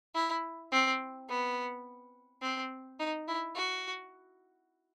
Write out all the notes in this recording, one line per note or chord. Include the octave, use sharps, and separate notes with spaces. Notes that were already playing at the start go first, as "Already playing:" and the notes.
E4
C4
B3
C4
D#4
E4
F#4